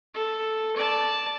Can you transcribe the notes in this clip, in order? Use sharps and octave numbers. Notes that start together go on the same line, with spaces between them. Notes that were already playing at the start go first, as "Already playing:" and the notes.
A4
D5 A5